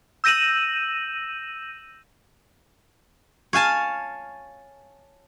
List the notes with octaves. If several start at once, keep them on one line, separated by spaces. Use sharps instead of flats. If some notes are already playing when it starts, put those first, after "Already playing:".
E6 G6 A#6 D#7 E7 F#7
C#5 F5 G#5 A5